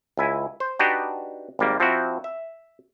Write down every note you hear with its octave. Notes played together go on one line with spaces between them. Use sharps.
C#2 E4 G#5
C5
D4 D#4 F#4 G4 B4 G5
G#1 G3 A#3
F3 C4 E4 F#4
E5